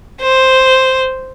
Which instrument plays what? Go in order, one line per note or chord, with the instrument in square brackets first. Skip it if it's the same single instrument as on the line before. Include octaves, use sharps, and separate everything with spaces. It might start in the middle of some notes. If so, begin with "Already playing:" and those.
[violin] C5